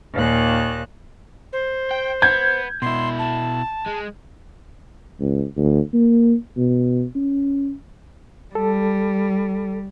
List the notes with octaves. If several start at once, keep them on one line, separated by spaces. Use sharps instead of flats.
D#2 A#2 D#3 F#6
C5
G5
B3 G6 G#6
B2 E4 C6
A5
G#3
C#2
D2
A#3
B2
C#4
G3 A4